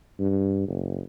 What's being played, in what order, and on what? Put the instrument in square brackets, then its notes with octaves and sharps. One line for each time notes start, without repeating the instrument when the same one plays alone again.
[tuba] G2
F#1